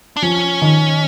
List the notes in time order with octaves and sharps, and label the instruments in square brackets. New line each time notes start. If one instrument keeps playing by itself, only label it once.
[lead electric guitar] D4
[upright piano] F3 [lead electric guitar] C#4
[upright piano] D#3